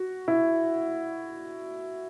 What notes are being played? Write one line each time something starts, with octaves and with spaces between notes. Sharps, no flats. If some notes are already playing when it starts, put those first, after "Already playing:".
Already playing: F#4
E4